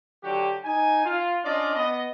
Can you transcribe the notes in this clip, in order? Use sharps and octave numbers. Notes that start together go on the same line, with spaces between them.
D3 F#3 F#4 G4
D#4 G#5
F4
C#4 D4 F4 D5 D#5
B3 D#5